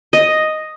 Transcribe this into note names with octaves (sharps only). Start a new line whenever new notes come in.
D#5